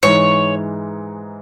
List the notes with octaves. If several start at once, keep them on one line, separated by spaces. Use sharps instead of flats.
G#2 E3 G#3 D#4 C#5